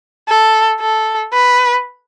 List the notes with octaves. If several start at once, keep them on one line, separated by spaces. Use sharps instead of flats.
A4
A4
B4